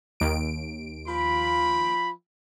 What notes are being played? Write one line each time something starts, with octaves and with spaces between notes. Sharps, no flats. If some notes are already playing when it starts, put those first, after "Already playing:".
D#2 D7
F3 F4 B5